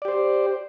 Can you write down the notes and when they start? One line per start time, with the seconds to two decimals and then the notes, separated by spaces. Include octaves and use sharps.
0.02 D5
0.05 G4
0.08 C5